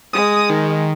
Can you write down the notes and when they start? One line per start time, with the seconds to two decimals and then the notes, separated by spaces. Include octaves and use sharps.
0.13 G#3 D#6
0.50 D#3